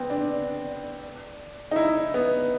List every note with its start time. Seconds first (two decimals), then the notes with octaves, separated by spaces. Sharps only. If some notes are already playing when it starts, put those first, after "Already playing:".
Already playing: B3 C4
0.10 D4
1.71 D#4
1.76 E4
2.14 B3